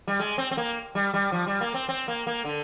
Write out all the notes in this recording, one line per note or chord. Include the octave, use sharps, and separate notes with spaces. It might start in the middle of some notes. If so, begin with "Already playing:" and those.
G3
G#3
C4
C4
A#3
G3
G3
F3
G3
A#3
C4
C4
A#3
A#3
D3